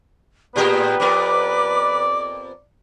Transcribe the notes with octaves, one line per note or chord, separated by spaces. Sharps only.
A2 B3 G4 G#4 A#4 B4
F2 B3 A#4 D5 D6